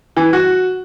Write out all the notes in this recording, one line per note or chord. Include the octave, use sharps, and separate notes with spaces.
E3
F#4